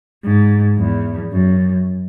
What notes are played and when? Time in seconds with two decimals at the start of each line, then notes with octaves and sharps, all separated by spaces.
0.24 G#2
0.78 E2
1.32 F#2